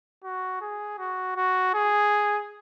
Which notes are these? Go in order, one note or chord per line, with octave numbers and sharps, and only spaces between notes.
F#4
G#4
F#4
F#4
G#4